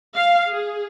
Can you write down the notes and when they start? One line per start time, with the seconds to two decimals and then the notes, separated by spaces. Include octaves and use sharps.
0.15 F5
0.50 G#4